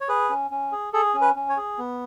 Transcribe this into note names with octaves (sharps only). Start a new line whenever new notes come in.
C#5
G#4 B4
C#4
C#4
G#4
G#4 A4
C#4
B4
C#4
C#5
G#4
B3